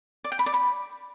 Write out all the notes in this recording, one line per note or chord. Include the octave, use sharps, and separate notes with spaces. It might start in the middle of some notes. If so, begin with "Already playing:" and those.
D5
G5
B5
D5
B5